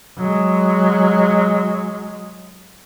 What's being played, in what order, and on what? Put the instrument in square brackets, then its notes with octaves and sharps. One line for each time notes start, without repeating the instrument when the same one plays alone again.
[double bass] F#3 G#3